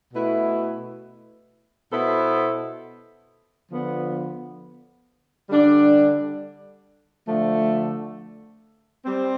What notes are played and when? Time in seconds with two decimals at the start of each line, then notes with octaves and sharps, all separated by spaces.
0.12 B2 A3 E4 B4
1.91 B2 B3 E4 A4 C5
3.70 D3 F3 B3
5.49 D3 G3 D4
7.26 D3 F3 A3
9.05 G3 C4